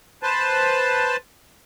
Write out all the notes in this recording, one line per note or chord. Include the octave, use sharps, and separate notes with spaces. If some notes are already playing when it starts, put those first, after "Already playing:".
B4 C5 A5